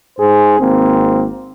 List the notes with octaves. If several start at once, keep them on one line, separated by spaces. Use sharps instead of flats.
G#2 G#4 C5
G#1 A#3 C4